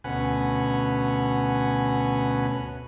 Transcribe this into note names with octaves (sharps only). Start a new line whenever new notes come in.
D2 B2 C#4 B4 F#5 G#5